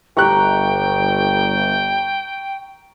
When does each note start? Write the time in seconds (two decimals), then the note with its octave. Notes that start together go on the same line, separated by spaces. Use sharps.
0.17 G1 G4 G5 A#5 C#6 F#6